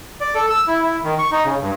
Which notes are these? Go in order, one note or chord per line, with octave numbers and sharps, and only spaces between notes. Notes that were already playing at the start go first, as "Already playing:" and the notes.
D5
A4
E6
E4
E4
D#3
C#6
D#4
C#3
G2